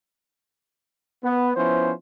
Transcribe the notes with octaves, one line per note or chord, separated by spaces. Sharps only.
B3
F3 B3 C#4 E4 C5